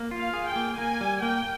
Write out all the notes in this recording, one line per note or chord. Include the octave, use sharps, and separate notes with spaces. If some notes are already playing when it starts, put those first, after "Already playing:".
Already playing: A#3
F4
F5
G#4
G5
A#3
A#3 G#5
G3
A#3 G5